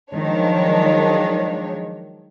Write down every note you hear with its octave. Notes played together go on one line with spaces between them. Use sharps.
D#3 F3 F#3 G#3 D4 C#5